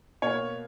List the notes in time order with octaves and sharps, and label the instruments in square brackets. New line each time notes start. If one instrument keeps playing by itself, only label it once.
[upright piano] B2 A#3 C#5